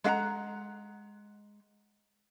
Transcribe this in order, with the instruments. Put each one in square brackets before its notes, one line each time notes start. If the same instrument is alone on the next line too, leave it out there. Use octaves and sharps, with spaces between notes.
[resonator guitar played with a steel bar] G#3 A3 F5 F#5 A#5